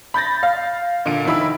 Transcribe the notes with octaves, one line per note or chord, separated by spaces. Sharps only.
B5 G6 A6 A#6
F5
A#2 D3 D7
F1 D#3 E4 B5 E6